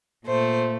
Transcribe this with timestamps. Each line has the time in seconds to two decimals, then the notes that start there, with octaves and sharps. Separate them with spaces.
0.26 A#2 A3 C5